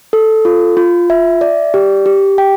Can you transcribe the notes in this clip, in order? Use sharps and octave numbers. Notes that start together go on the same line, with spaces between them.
A4
F4
F4
E5
D5
G4
G4
G5